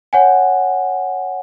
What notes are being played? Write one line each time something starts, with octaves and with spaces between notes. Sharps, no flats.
C#5 F#5 G#5